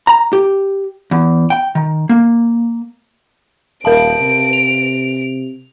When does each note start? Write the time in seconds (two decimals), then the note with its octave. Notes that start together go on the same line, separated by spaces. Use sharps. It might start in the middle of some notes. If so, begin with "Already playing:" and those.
0.07 A#5
0.33 G4
1.11 E2
1.50 G5
1.75 D#3
2.09 A#3
3.85 D#1 A#4 F5 A5 D7
4.21 C3
4.53 F7